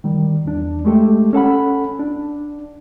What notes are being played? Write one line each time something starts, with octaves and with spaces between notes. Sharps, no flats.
D#3 G3
E2 D4
G#3 A3 G4 A4
C#4 A4 F#5 B5
D4